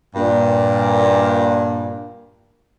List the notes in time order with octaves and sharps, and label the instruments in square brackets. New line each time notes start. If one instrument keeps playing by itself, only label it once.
[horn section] G2 A#2